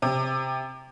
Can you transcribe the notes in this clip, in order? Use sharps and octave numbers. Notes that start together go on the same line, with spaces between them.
C3